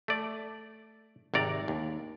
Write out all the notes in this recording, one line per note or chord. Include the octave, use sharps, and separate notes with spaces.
A3 D5
G#1 C3 D5 A#5
D#2